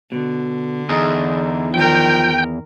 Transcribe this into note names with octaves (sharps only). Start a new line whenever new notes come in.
B2 D3
E2 D#4 G#4
D#3 F3 A#4 G5